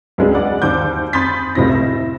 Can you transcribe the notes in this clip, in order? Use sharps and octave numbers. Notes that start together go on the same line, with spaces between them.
C#2 G#3 D4
D5 F#5
D#2 C5 D6 G6
B5 C6 D#6 G6 A6 B6
F1 C#2 A2 C3 E4 A#6
E5